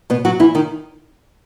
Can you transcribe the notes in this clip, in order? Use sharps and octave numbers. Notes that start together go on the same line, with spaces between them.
B2 B3
F#3 F#4
E3 E4
D#3 D#4